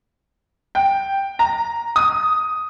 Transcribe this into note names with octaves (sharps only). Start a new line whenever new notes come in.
G5
A#5
D#6